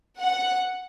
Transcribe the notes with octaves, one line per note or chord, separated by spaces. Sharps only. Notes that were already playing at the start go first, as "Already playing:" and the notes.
F#5